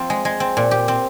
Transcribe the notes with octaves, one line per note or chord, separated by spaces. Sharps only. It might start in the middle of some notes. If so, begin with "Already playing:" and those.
Already playing: F3 C4 F4
G#3
G#3
C4
A#2
G4
C4